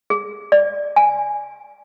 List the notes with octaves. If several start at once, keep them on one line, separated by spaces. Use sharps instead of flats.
G#4
D5
G#5